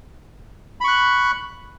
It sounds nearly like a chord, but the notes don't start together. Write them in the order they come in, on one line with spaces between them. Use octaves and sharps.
B5 C#6 F#6